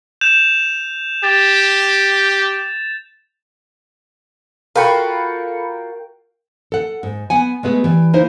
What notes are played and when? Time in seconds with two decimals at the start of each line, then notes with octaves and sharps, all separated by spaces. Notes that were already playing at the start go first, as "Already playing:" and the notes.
0.21 G6 E7 F7
1.24 G4 A6
4.76 F4 F#4 A4 A#4 G5 B5 C#7
6.72 A4 F#5
7.03 G#2
7.30 B3 F#5 G#5
7.63 G#3 A3 B3 G#4
7.84 E3 G3
8.13 A#3 D#4 E4 C5